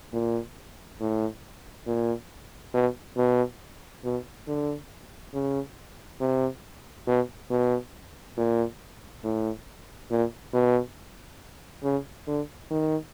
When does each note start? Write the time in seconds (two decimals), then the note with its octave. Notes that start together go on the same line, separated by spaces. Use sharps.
0.13 A#2
1.00 A2
1.87 A#2
2.74 B2
3.17 B2
4.04 B2
4.48 D3
5.34 C#3
6.20 C3
7.07 B2
7.50 B2
8.37 A#2
9.24 A2
10.11 A#2
10.54 B2
11.84 C#3
12.27 D3
12.71 D#3